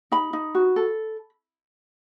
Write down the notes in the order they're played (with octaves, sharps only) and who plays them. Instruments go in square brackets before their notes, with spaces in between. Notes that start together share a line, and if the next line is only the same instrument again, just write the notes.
[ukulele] D#4 B5
D#4
F#4
A4